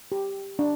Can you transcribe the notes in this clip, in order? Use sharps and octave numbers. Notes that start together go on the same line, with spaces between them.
G4
D4